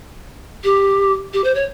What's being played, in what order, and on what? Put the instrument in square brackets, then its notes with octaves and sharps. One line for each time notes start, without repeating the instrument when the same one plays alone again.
[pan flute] G4
G4
C5
C#5